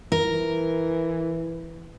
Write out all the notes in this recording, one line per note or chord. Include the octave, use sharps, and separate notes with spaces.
E3 A#4